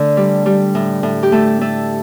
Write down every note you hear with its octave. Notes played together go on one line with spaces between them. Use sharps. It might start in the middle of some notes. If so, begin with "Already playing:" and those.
Already playing: D3 A3
G3
G3
A2
A2
G4
A3 A4
A3 A4